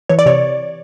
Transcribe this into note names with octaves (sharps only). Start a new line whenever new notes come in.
E3 C#5
D5
C3 C#5